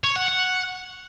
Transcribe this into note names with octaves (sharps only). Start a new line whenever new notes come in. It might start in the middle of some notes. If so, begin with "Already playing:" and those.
C#5
F#5
F#5